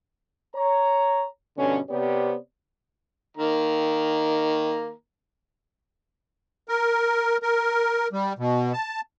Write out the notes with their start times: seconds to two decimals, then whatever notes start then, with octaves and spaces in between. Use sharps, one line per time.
0.55 C#5 A#5
1.57 G2 B2 D3 C#4
1.89 C3 B3 C4 G4 C#5 D5
3.37 D#3 A#3 A#5
6.69 A#4
7.43 A#4
8.13 G3
8.39 B2
8.73 A5